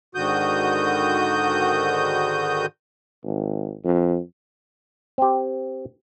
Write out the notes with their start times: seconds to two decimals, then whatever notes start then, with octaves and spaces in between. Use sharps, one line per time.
0.15 G#2 D3 D#3 F#4 D#6 G6
3.24 G#1
3.84 F2
5.18 C4 G4